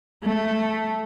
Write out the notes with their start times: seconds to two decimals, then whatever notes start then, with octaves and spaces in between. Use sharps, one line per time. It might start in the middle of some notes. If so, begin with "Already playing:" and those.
0.24 A3